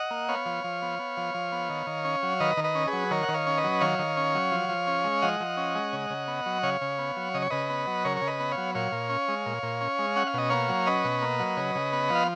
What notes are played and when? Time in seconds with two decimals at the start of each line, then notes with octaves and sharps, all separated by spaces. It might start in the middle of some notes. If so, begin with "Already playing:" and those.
Already playing: D#5 F#5
0.11 A#3
0.29 B3 C#5 F5
0.46 F3
0.64 F3
0.82 B3
0.99 B3
1.17 F3
1.35 F3
1.52 B3
1.69 D#3
1.87 D#3
2.05 C#4
2.23 F#3
2.40 D#3 B4 D#5
2.57 D#3
2.64 B4 D#5
2.75 C#4
2.87 G#4 B4
2.93 F#3
3.11 D#3 A#4 C#5
3.23 F#5
3.28 D#3
3.34 C#5 F5
3.47 C#4
3.58 B4 D#5
3.64 F#3
3.81 D#3 C#5 F5
3.99 D#3
4.17 C#4
4.35 F#3
4.52 F3
4.69 F3
4.87 C#4
5.04 G#3
5.22 F3 D#5 F#5
5.41 F3
5.57 C#4
5.75 G#3
5.93 C#3
6.10 C#3
6.28 B3
6.46 F#3
6.63 C#3 C#5 F5
6.81 C#3
6.99 B3
7.17 F#3
7.34 C#3 D#5
7.42 C#5
7.50 C#3 B4 D#5
7.70 B3
7.87 F#3
8.05 C#3 A#4 C#5
8.17 C#3 C#5
8.27 B4 D#5
8.40 B3
8.52 C#5 F5
8.58 F#3
8.75 A#2 C#5 F5
8.92 A#2
9.10 C#4
9.28 G#3
9.46 A#2
9.63 A#2
9.81 C#4
9.99 G#3
10.16 C#4 F#5
10.27 F5
10.34 B2 D#5
10.50 A#3 C#5 F5
10.69 F#3
10.87 C#4 B4 D#5
11.04 B2
11.22 A#3
11.40 F#3
11.57 C#3
11.75 C#3
11.93 B3
12.10 F3
12.15 F5